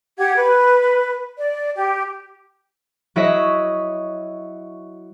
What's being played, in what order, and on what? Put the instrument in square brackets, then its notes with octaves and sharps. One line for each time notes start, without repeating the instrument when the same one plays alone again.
[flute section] G4 F#5 G#6
B4
D5
G4
[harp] F#3 E4 C#5 D#5 E5